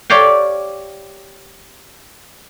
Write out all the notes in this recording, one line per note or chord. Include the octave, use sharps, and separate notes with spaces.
G4 C#5 D5 F5 G5